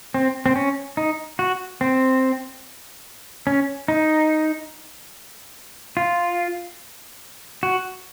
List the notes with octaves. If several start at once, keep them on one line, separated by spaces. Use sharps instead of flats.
C4
C4
C#4
D#4
F#4
C4
C#4
D#4
F4
F#4